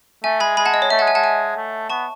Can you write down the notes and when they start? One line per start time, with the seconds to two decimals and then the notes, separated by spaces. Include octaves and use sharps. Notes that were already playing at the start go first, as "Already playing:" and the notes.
0.24 A3 E5 G#5
0.40 G#3 G#5 B5
0.57 G#3 G#5 B5
0.66 F#5 A5
0.74 D#5
0.82 C#5
0.90 A3 E5
0.99 G#3 F#5 A5
1.07 E5 G#5
1.13 G#3 F#5 A5
1.24 E5 G#5
1.56 A3
1.90 B3 A5 C#6